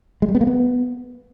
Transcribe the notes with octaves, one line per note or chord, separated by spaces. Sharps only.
G#3
G3
B3
A#3
B3